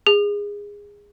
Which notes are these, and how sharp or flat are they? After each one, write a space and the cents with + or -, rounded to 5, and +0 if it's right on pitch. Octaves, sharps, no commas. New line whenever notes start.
G#4 -20